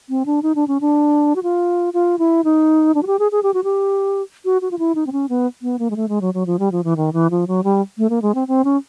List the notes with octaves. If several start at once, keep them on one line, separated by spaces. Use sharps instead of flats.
C4
D4
D#4
D4
C#4
D4
F#4
F4
F4
E4
D#4
D4
F#4
G4
G#4
G#4
G4
F#4
G4
F#4
F#4
F4
E4
D#4
C4
C#4
B3
B3
A#3
G#3
A3
G#3
F#3
F#3
F3
G3
F3
E3
D#3
E3
F3
F#3
G3
A3
A#3
G#3
C4
C4
C#4